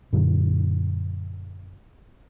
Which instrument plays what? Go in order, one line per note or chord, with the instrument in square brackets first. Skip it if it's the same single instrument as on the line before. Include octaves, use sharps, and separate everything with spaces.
[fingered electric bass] F#2 A#2 D3 F#3